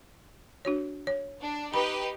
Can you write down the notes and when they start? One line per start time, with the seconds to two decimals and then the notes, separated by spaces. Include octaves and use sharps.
0.65 D4 F#4 C#5
1.07 C#5
1.40 D4
1.74 D#4 G4 B4 B5